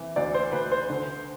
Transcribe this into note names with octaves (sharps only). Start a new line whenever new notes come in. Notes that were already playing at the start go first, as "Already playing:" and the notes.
Already playing: C3 E3
D2 D5
C5
D2 B4
C5
D3